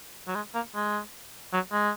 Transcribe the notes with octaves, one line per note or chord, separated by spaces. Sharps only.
F#3
G#3
A#3
G#3
F#3
G#3